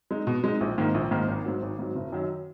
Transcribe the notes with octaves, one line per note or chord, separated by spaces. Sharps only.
G#3 D#4
B2
G#3 D#4
A#1
G#2 D#3 A#3
A#1
G#2 D#3 A#3
G#1
G#2 F#3
G#1
G#2 F#3
F#1
F#2 D#3 F#3